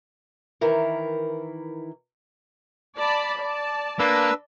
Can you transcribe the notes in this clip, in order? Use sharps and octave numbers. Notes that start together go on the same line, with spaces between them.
D#3 E3 E4 A#4
D5 A5 B5
D5 A5
A#3 D4 B4 E6